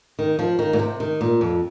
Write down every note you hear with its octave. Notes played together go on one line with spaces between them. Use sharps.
D#3
F3
D#3
A#2
C3
D#3
A#2
F2